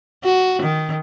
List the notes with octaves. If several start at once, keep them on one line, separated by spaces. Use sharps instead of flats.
F#4
D#3